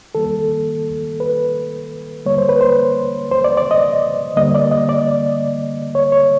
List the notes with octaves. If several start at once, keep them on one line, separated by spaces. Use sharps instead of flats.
D#3 G3 A#3 A4
B4
D3 G3 A#3 C#5
C5
B4
C5
C5
D5
D5
D#5
D3 G3 A#3 D#5
D5
D#5
D5
C#5
C#5